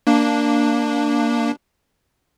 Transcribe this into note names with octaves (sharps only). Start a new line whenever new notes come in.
A#3 D4